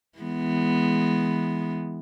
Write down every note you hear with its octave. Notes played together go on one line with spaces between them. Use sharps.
E3 G#3 B3